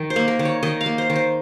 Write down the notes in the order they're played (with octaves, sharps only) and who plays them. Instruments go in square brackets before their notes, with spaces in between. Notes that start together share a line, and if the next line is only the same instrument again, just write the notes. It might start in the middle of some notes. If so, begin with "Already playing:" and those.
Already playing: [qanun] D#3
C5
A#3
A#4
D#3
C#5
D#3 D#5
F5
A#3
C5
D#3
C5